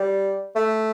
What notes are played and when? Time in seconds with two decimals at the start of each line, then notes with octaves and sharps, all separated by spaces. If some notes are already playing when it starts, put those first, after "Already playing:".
Already playing: G3
0.56 A3